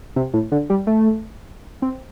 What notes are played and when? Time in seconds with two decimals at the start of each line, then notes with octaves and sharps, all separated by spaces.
0.16 C3
0.33 A2
0.52 D3
0.70 G3
0.87 A3
1.82 C4